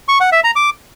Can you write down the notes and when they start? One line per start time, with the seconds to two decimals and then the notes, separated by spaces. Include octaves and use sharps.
0.08 C#6
0.20 F#5
0.32 E5
0.44 A#5
0.56 D6